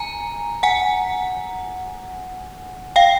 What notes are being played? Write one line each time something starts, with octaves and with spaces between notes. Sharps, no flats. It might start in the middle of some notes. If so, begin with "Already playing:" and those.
Already playing: G#5 A#5
F#5 G#5
F5 G5